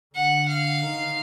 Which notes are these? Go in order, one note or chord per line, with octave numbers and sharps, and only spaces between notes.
D3 F#5
F5
D#3